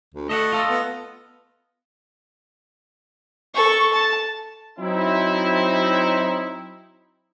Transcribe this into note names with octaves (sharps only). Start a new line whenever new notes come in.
D2
A3 D#5 E5 F#5
F4 A4 D#5
B3
A4 C#6
A5
F#3 C4 D#4 E4